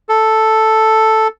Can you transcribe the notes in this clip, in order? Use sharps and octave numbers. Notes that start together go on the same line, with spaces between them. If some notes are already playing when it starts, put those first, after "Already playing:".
A4